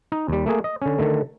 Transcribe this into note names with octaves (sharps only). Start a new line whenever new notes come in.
D#4
D#2 G3
A3 A#3 G#4
D#5
D3 C#4
D3 D#3 A3